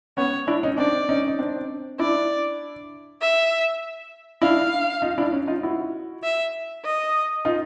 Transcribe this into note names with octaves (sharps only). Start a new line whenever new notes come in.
B3 C#4 C#5
D4 E4
C#4 D#4
C4 D4 D5
C#4 D#4
D#4
C4 D4
D4 E4 D5
E5
D4 E4 F5
D#4 F4
D4 E4
C#4 D#4
D#4 F4
E4 F#4
E5
D#5
D#4 F4